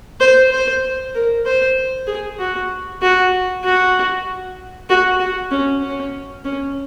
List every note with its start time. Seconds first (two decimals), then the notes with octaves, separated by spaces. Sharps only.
0.20 C5
0.51 C5
1.15 A#4
1.46 C5
2.07 G#4
2.39 F#4
3.02 F#4
3.64 F#4
4.89 F#4
5.20 F#4
5.51 C#4
5.83 C#4
6.45 C#4